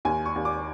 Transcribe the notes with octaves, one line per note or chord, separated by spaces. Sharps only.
D#2 G#5
C#6
D#2
D6